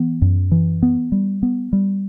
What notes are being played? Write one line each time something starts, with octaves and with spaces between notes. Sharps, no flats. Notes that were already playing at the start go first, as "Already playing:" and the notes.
Already playing: E3 B3
F#2
E3
B3
G3
B3
G3